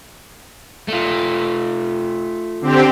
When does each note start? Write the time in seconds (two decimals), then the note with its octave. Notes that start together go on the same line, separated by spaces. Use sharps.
0.88 A3 F4
2.61 D3 C4 G4